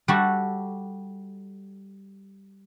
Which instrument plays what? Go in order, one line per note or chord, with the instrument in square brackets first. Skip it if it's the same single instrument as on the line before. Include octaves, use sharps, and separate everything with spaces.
[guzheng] G3 F#4 A4